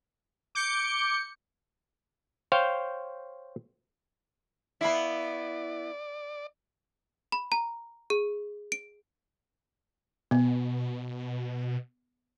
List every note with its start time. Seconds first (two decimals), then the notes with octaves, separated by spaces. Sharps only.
0.55 D6 G6 C#7
2.52 C5 C#5 F5 G5
4.81 B3 E4 D5 E5 F5 B5
7.32 B5
7.52 A#5
8.10 G#4
8.72 D7
10.31 B2 B3